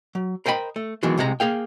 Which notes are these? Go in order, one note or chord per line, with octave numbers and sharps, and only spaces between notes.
F#3
A#4 C5 D#5 G5 B5
A3
B2 D#3 E3 F#3 G#3
C2 C3 G#3 A4 A#5
A#3 G#4 F5 G5